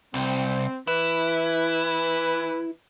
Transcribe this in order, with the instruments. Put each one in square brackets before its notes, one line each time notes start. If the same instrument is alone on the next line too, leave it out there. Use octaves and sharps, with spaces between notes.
[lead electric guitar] C2 [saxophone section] C4
[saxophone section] E3 B4 [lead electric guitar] E4